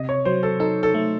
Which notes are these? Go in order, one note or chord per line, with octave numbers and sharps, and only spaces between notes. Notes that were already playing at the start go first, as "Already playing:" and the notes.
Already playing: C3 D#5
C#5
F#3 C5
A4
D#4 A4
A4
A3